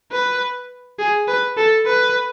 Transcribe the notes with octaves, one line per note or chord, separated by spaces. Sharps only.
B4
G#4
B4
A4
B4